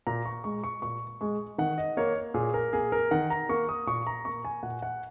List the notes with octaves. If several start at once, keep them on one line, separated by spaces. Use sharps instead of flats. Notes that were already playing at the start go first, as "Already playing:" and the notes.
A#2 A#5
C#6
G#3 C#6
C#6
A#2 C#6
G#3 C#6
D#3 F#5
D#5
A#3 C#5
A#2 G#4
A#4
A#3 G#4
A#4
D#3 F#5
A#5
A#3 C#6
D#6
A#2 C#6
A#5
A#3 C#6
G#5
A#2 F#5
F#5